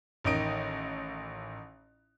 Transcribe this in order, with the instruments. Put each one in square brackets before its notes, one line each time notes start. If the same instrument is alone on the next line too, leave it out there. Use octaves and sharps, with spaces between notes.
[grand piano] A1 D#3 D#4 D#6 D7